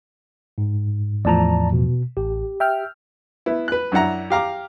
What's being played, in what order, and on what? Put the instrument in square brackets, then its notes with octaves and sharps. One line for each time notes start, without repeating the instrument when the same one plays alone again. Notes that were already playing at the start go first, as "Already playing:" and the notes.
[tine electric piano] G#2
[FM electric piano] E2 A2 F3 [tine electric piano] D5 A5 A#5
[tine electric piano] B2
[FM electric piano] A1 [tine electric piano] G4
[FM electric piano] E5 G5 F6
[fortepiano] B3 E4
B4 F#6
F#2 D4 E4 F#5 A#5
G4 F5 A#5 D6